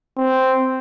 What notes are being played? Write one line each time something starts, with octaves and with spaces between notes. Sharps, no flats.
C4